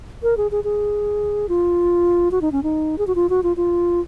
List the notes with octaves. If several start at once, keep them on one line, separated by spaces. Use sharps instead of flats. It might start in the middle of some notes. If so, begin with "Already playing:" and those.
A#4
G#4
G#4
G#4
F4
F#4
D#4
C#4
D#4
G#4
F#4
F4
F#4
F4
F4